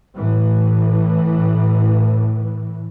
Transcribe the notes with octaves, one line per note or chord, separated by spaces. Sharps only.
A2 E3